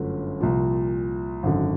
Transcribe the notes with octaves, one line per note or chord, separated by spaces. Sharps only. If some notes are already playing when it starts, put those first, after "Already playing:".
Already playing: G1 F#2 D3 F3 A3
C2 A#2 F3
G#1 F#2 D3